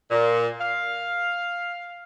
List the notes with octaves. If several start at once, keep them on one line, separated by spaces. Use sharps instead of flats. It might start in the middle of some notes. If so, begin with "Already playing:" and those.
A#2
F5